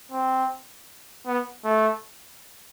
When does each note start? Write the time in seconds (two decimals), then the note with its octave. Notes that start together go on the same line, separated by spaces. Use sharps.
0.12 C4
1.27 B3
1.65 A3